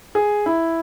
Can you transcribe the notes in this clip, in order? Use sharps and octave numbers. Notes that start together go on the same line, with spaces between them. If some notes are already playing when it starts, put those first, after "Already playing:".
G#4
E4